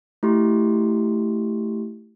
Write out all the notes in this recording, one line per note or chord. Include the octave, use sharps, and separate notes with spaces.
A3 E4 G4 C6